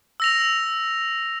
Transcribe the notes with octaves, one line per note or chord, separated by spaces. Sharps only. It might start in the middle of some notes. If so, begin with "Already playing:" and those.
E6 A#6 F7